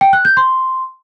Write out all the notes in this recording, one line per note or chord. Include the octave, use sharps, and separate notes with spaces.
G5
F#6
G6
C6